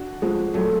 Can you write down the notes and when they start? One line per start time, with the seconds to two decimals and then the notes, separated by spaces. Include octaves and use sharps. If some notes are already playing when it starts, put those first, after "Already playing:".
Already playing: D4 F#4
0.22 F3 G#3
0.54 F#3 A3